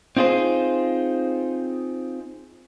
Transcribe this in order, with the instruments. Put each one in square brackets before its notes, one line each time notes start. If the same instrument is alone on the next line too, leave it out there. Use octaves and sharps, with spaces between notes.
[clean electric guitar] C4 D#4 F4 G#4 C5